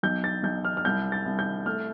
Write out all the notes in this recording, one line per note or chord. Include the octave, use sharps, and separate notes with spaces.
B1 G6
A6
B1 G6
F6
F6
C2 G6
A6
C2
G6
A3 F6